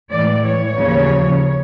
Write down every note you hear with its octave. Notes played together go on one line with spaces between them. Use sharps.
A2 E3 G#3 D5
C#5
D#2 C#3 F3